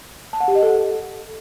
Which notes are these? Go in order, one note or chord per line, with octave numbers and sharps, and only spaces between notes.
A5
F#5
G4
D#5
A4